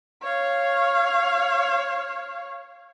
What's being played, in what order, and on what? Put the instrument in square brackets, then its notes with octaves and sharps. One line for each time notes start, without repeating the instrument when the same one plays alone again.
[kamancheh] C#5 F5